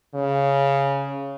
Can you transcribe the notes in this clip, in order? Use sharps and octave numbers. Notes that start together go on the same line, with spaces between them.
C#3